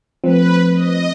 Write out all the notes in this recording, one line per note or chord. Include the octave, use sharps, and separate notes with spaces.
F3 A3 C4 B4
D#5